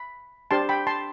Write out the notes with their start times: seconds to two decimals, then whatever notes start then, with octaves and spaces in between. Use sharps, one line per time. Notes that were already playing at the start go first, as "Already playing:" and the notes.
Already playing: B5
0.51 D4 G4 C5 A5 C6
0.69 G5 B5
0.87 A5 C6